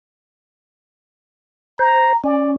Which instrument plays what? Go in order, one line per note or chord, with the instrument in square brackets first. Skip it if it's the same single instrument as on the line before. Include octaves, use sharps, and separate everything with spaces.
[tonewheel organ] C5 [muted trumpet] A#5
[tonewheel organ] C#4 [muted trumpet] D5